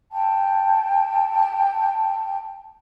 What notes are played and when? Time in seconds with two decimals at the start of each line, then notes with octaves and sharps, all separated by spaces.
0.11 G5 A5